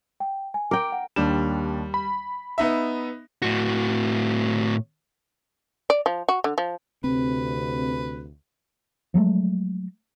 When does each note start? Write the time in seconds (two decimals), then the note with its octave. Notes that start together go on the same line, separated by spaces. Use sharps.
0.20 G5
0.54 G#5
0.71 A#4 G5 D6
0.92 F#5
1.16 D#2 G3 D4 E7
1.94 B5
2.58 B3 D#4 E5
3.42 A2 F#4
5.90 D5
6.06 F3
6.29 F#4
6.44 D3
6.58 F3
7.04 D2 C3 C4 B4
9.14 F3 F#3 G#3 A3